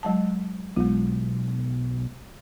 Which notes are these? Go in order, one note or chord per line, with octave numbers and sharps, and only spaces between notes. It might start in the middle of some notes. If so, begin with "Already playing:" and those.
F#3 G#3 A5
B1 G#3 F4